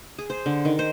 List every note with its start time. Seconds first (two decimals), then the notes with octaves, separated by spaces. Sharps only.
0.19 G#4
0.30 C5
0.46 D3
0.65 D#3
0.79 C5